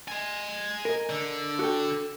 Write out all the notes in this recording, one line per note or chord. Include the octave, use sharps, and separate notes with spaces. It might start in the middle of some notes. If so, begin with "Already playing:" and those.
G#5 C6
A#4 D#5
D3
F#4 A4 G5